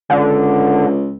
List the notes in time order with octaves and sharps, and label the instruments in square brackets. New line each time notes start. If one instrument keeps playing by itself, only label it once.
[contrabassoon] C#2 [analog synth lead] D3